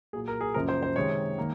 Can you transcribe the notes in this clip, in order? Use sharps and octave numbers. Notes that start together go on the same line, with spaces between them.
A#2 F#3 A#3 G#4
A#4
G#4
F#2 C#3 F3 A#3 A#4
C5
C5
C3 D#3 G#3 C#5
D#3 A#3